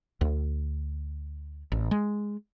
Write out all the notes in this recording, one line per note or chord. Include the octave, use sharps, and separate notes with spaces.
D2
A1
G#3